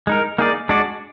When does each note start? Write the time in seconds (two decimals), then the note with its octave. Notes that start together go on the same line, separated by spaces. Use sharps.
0.07 G#3 D#4 A#4
0.38 A#3 D#4 G#4 D5
0.69 G#3 D4 F#4 D5